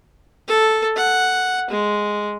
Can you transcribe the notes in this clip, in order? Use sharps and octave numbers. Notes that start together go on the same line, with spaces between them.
A4
F#5
G#3